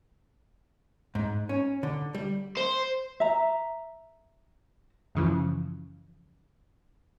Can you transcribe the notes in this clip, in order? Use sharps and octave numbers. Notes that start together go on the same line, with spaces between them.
G#2
C#4
D3
G3
C5
E5 A#5
F#2 C#3 E3 F3